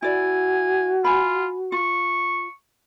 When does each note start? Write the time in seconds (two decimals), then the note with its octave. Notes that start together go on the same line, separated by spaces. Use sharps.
0.02 E4 F#4 D5 G#5
1.04 F4 G#5 B5
1.72 F4 C#6